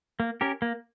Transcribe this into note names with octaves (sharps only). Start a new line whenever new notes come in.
A#3
C#4 G4 A#4
A#3